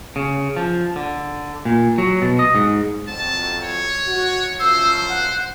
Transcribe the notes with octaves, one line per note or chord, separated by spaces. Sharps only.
C#3
F3
D3
A#2
F#3
B2
D#5
G#2
F2 F#3 C4 A5
C#5
F#4
F#2 F3 C5 E6
F#5